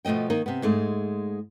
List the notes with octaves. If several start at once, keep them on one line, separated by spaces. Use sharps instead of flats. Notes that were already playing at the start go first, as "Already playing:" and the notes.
B2 F3 A3 D#5 G5
D#3 A#3 D#4
C3 B3
G#2 G#3 A3